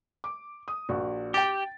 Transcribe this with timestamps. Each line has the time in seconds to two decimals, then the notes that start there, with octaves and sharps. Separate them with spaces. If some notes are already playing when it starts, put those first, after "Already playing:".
0.24 D6
0.68 D#6
0.89 A#1 F#4
1.34 G4 G5 A6